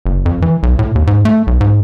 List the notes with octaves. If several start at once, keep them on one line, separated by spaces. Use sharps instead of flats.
F#1
F2
E3
B1
A2
D#2
G#2
A3
B1
G#2